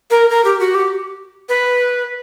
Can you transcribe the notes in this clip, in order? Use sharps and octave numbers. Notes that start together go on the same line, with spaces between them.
A#4
A#4
G4
F#4
G4
B4